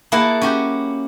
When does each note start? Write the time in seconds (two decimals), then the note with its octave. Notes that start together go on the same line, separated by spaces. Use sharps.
0.12 A#3 E4 G#4 F#5 A5
0.42 C#4 F#4 G4